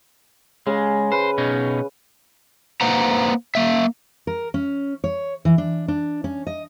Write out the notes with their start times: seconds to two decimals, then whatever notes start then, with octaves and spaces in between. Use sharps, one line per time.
0.67 C#3 G#3
1.12 B4 C5
1.38 B2 C#4 D#4
2.81 A#3 B4 C5 F#5 A#5
3.55 A#3 E5
4.27 A#4
4.54 C#4
5.04 C#5
5.45 E3
5.58 D4
5.88 D4
6.24 C#4
6.47 D#5